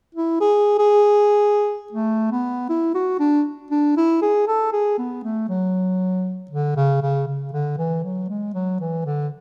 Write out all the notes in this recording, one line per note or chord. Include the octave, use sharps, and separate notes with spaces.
E4
G#4
G#4
A3
B3
E4
F#4
D4
D4
E4
G#4
A4
G#4
B3
A3
F#3
D3
C#3
C#3
C#3
D3
E3
F#3
G#3
F#3
E3
D3